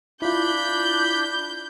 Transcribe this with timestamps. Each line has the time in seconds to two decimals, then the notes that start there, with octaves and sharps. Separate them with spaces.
0.22 D4 E4 F4 B5 G6